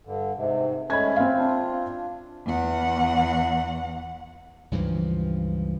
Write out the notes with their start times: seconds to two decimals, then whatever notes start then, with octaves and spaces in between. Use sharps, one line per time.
0.05 G2 D3
0.36 G#2 C3
0.90 G#3 A3 C#4 B5 G#6
1.16 C4 F5
1.37 D4 F4
2.46 E2 F#5
4.71 C#2 G2 E3 F3